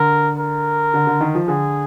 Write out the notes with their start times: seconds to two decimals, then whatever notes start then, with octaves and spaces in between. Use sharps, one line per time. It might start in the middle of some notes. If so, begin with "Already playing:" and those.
Already playing: D3 A#4
0.39 A#4
0.94 D3
1.07 D3
1.21 D#3
1.35 F3
1.48 D3 G#4